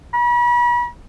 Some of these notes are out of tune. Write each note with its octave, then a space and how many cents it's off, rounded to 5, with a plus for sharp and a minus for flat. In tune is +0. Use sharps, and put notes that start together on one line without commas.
B5 -40